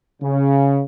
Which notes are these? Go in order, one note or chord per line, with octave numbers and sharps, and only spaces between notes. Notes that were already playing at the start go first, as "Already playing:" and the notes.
C#3